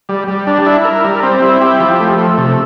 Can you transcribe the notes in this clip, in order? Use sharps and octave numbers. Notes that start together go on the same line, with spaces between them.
G3
G3
D4
E4
A#4
G3
C4
E4
G4
F3
A3
A3
C3